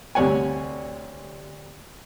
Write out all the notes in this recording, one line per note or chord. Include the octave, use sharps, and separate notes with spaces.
D2 C3 G3 C#5 F#5 G#5